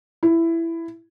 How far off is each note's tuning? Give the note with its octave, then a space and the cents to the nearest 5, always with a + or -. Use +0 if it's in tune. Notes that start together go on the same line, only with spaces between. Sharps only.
E4 +10